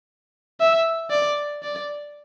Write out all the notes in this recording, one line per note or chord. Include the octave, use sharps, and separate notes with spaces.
E5
D5
D5